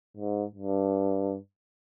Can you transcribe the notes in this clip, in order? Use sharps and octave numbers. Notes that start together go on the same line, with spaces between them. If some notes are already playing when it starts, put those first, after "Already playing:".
G#2
G2